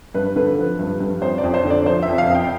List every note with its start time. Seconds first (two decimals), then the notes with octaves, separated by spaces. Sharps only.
0.14 G2 B4
0.36 D3 B4
0.58 F3
0.79 G2
1.00 G2
1.22 F2 C5
1.38 D5
1.43 F2
1.54 C5
1.65 D3
1.70 D5
1.86 F3 C5
2.03 E5
2.08 F2
2.18 F5
2.29 F2
2.35 G5